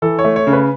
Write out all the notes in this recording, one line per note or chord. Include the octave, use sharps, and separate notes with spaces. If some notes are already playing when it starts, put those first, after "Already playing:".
E3 A4
C#5
A3
C#5
C#3
B4